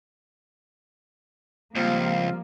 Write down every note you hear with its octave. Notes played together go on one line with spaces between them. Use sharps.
C#2 F3 G3 A#3 C4 F4 F5